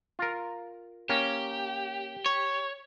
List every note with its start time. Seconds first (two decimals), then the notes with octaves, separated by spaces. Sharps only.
0.19 F4 A#4
1.09 A#3 C#4 G4
2.26 C#5